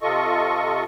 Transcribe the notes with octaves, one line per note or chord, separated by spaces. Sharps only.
C3 F4 A4 D#5 C#6